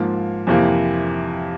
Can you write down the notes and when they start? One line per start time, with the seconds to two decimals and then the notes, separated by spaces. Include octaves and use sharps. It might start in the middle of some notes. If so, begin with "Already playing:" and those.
Already playing: G#2 F3 A#3 F4
0.47 F2 C3 E3 A#3